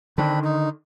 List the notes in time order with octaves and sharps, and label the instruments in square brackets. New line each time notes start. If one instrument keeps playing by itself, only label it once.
[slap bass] D3 D#3 [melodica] C4 D4 B5
[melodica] D#4